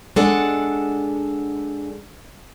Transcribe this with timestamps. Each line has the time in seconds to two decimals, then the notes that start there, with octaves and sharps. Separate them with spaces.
0.16 G#3 D4 A4 F#5